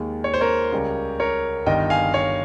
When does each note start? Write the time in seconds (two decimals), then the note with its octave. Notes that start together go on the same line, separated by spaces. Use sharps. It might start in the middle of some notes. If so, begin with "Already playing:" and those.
Already playing: D#2 D#3 G#3
0.24 C#5
0.34 C5
0.41 A#4 C#5
0.72 C#2 C#3 G3
1.20 A#4 C#5
1.66 G1 G2 D#3 D#5 G5
1.90 F5 G#5
2.14 C#5 F5